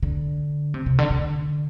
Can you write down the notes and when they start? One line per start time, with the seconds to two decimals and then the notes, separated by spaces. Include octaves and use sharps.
0.02 D3
0.74 C3
0.86 C3
0.99 D3
1.10 D3